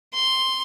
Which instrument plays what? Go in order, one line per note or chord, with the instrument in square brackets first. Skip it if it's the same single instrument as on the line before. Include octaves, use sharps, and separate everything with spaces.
[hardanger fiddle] C6